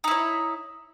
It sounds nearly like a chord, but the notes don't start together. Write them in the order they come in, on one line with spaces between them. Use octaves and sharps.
D#4 E4 C#5